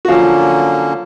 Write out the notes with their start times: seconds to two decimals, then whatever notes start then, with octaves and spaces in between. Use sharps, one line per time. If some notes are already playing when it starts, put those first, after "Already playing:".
0.05 F#4
0.08 D3 F3 F#3 A#3 C#4 F4